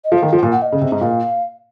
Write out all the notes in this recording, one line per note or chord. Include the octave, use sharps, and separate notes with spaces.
D#5
F3 F5
D#3
F3
F#5
A#2 F5
F#5
D#5
C#3
C3
G#2
A#2 F5